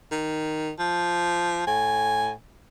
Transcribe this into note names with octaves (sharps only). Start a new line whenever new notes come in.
D#3
F3
A2 G#5